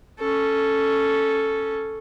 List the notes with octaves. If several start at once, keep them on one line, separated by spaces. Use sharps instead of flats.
C#4 A4